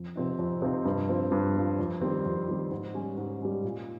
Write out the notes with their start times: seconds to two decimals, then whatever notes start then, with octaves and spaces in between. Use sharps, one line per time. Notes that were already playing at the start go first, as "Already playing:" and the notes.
Already playing: F2
0.16 C3 F3 C4 D#4
0.39 F2
0.62 C3 F3 C4 D#4
0.85 G2
1.09 F3 C4
1.32 G2
1.56 F3 C4
1.79 F2
2.01 D#3 G3 C4
2.26 F2
2.49 D#3 G3 C4
2.71 G#2
2.94 G3 C#4
3.18 G#2
3.42 G3 C#4
3.64 A#2